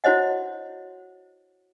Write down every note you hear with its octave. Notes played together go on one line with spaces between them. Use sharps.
E4 F#4 C5 C#5 D#5 F#5